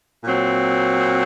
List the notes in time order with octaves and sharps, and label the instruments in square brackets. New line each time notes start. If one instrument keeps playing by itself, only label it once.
[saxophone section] A#2 F#3 C4